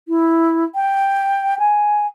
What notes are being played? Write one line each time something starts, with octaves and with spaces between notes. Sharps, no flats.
E4
G5
G#5